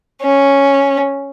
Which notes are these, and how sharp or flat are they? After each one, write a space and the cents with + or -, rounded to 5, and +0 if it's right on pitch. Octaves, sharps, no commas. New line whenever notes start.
C#4 +0